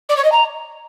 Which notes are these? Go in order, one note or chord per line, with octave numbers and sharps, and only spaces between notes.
D5
C#5
D#5
A#5